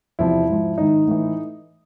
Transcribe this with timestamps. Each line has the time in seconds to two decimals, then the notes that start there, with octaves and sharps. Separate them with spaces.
0.19 E2 C3 F3 E4
0.48 G#2 F3
0.78 G#2 D#3 D#4
1.07 A2 E3